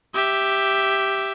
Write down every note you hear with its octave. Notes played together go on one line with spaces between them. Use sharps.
G4 E5